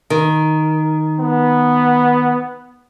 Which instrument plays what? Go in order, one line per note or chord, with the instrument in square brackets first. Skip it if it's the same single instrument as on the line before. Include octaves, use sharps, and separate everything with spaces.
[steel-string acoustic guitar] D#3
[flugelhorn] B3